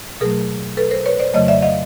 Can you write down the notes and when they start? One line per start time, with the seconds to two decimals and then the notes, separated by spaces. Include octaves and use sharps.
0.21 B2 F#3 A3 G#4 A#4
0.77 A4 B4
0.91 A#4 C5
1.06 B4 C#5
1.19 C5 D5
1.34 F2 C#3 F#3 A3 C#5 D#5
1.48 D5 E5
1.62 D#5 F5